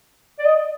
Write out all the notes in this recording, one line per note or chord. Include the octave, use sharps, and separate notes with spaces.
D5
D#5